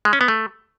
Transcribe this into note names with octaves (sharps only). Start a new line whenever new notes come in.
G#3
C#4
B3
A3